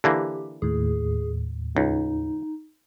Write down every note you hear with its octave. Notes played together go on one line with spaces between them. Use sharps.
D3 E3 A#3 G4
D#2 A2 G#4
C#2 D#4